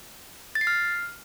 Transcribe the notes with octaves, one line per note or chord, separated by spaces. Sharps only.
A6
C7
F6